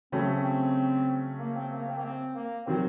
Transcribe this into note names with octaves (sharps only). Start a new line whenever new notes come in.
C#3 F#3 A3 C4 C#4
C4
A#3
C4
A#3
C4
A#3
C4
A#3
C3 D#3 F#3 C4